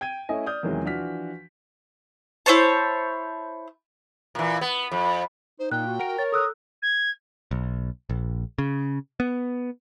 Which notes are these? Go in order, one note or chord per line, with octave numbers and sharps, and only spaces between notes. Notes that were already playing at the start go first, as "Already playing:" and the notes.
G5 G#6 D#7
A3 C#4 E4 D#5 G#5
D5 D#6 F6 G6
E2 C3 D#3 E3 F#3 G#3
E3 F3 D4 F#4 F6 B6
E4 C5 C#5 A5
A#2 E3
B3
F2
D#4 C5
A#2 G5 F#6
F#4
A#4 F#5 D7
C#5 A6
A4 D#6 E6 F#6
G#6
B1
A#1
C#3
B3